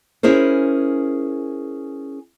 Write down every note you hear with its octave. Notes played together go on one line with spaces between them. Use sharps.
C#4 E4 G#4 A#4 C5